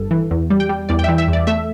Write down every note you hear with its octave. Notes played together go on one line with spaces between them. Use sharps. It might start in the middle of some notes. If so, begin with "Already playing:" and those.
Already playing: G1 G2 A4
E3
E2
G3
G5
G3
E2 D5
G5
E3 E5
E5
E2
D5
A3 E5